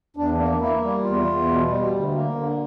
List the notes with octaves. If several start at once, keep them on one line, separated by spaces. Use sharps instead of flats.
E2 D4
A#3
A#3 E4
G3
E2 F4
E2
B2
G3
D2
A#3
D3